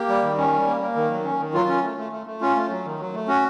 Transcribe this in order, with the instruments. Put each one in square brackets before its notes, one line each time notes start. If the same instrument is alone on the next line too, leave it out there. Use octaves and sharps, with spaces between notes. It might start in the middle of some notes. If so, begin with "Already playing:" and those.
Already playing: [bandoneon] A#3 G4
G3
D#3
C#4
G3
A#3
A#3
D#3
F#3
C#4
D#3
F#3 F4
C#4
A3
A3
A3
A3
C#4 F4
A3
F#3
D#3
F#3
A3
C#4 F#4